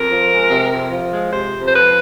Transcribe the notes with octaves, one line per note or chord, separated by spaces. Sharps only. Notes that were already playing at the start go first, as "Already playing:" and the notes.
Already playing: F2 A#4
F3
G#3
C3
F2
F3
G#3
C3 C5
F2
C5
F3 B4